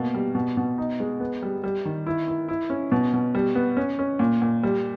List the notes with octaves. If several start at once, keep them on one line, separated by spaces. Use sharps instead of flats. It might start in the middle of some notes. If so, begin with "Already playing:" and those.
Already playing: B2 A#3
G3
B2
B2
D#4
G#3
B3
G3
G3
D#3
E4
E4
E4
C#4
B2
B2
G3
B3
C#4
C#4
A#2
A#2
G3